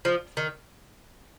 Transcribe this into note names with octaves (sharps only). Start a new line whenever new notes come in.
F3
D#3